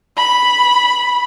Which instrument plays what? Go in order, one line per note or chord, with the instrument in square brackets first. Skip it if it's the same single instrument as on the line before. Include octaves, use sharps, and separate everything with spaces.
[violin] B5